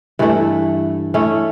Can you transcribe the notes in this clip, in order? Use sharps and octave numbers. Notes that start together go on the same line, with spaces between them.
G2 E3 A3 E4
A3 C#4 E4